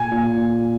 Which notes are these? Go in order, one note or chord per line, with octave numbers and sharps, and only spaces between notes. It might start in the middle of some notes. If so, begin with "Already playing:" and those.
Already playing: A#2 G#5
A#2
A#2